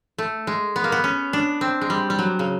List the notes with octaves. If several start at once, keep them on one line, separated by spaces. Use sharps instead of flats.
A3
G#3
B3
A#3
B3
C#4
D4
C4
G#3
G3
G3
F#3
C#3